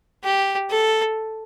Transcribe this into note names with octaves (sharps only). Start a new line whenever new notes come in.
G4
A4